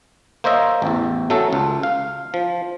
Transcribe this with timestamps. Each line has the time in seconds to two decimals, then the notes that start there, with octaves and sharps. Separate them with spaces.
0.44 A#3 C5 C#5 D#5 E5
0.82 A1 E2
1.30 F#3 A3 C#4 A4
1.53 C#2
1.83 F5
2.34 F3